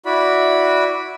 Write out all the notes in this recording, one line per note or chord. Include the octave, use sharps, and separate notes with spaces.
E4 F#4 D5 B5